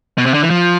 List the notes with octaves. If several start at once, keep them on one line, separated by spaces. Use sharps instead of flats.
B2
C3
D3
E3
F3